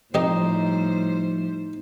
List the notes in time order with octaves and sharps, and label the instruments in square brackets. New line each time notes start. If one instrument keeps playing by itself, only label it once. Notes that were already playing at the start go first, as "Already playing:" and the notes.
[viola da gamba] A2 G3 C5 [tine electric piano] F3 [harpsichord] C4 G4 D#5 [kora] D#4